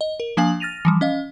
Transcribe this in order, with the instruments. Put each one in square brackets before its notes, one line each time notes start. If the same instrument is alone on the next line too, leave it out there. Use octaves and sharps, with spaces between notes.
[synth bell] D#5
A#4
F3 A#3 D4 F5 G#5 F#7
F6 A6 A#6 D#7 F7
E3 F3 G3
C#4 D#5 F5